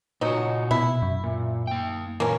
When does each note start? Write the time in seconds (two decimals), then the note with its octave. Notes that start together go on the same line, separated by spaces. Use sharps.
0.21 A#2 F#3 D#4 F#4
0.71 B2 E4
1.02 F#2
1.24 A#2
1.67 A#3 G5
2.20 A#2 E3 A#3 C#4